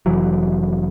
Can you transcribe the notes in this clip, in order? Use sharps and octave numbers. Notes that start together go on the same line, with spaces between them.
F1 E3 F#3